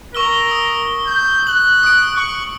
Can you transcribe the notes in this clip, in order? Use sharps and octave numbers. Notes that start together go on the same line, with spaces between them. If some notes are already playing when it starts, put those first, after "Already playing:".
A#4 C#6 E6 G7
D#6
G6
F#6 F#7
D#6 D7
C#6